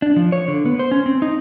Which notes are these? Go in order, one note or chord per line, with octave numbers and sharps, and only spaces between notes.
D4
F3
C#5
D3
B3
C5
C#4
C4
D#4